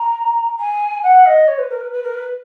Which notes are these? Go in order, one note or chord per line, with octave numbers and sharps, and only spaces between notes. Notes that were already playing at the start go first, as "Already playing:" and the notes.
Already playing: A#5
G#5
F#5
D#5
C#5
B4
A#4
B4
B4
A#4
B4